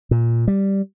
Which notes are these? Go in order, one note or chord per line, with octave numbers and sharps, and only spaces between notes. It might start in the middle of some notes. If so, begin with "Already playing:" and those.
A#2
G3